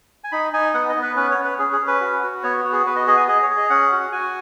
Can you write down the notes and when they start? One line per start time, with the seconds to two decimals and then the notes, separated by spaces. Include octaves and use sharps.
0.24 G#5
0.32 D#4 B5
0.53 D#4 G#5
0.74 B3 F#5
0.89 D#5
0.96 B3
1.02 B4
1.16 C#4 B4
1.31 C#5
1.38 C#4
1.44 B4
1.59 C#4 G#4
1.73 G#4
1.81 C#4
1.87 B4
2.01 F#4
2.23 F#4
2.43 B3 C#5
2.65 F#4
2.72 G#4
2.86 B3 B4
2.96 D#5
3.07 G#4 D#5
3.17 G#5
3.28 G#4 D#5
3.42 C#5
3.50 G#4
3.57 D#5
3.70 C#4 F#5
3.92 F#4
4.12 F#4 G#5